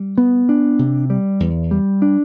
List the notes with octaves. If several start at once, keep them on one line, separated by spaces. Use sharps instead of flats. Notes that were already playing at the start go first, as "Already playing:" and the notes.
Already playing: G3
B3
D4
C3
G3
E2
G3
D4